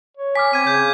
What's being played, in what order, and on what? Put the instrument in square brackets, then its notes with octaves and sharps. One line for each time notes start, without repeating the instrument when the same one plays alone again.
[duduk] C#5
[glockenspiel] G#5 D6 F6 [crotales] B6
[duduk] C4 [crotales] G#6 D#7
[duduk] C#3 [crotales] G6